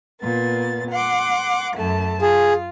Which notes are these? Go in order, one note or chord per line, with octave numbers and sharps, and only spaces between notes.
A#2 B3 A6
F#5 C6 D6
F#2 A3 A5
F4 G#4